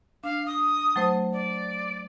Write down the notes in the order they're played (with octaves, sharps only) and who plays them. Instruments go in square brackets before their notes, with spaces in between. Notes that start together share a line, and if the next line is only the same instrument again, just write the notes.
[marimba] D4 [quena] F5
[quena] D#6
[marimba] F#3 A3 C5
[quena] D5